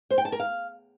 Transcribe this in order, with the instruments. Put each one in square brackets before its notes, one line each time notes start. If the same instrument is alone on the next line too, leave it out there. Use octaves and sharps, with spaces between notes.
[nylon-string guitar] C5
G5
A5
A#4
F5